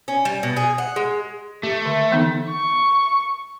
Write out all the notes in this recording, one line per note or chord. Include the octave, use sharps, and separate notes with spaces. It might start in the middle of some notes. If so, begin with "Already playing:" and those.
C#4
G3
B2
G#4
F#5
G#3
A3 G4
D3
E3 B3 D#4
C#6